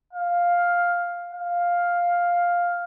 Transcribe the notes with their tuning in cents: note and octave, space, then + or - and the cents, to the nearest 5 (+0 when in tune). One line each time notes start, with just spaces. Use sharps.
F5 +5
F5 +5